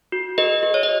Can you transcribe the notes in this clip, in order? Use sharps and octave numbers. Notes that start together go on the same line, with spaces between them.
F#4
G#4 B4 D#5
G#4
C#5
D#5